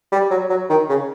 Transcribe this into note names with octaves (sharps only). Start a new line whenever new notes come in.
G3
F#3
F#3
D#3
C#3